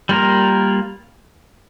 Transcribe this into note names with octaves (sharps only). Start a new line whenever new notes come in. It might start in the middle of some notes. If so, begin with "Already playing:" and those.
G3 A#3 F4 A#4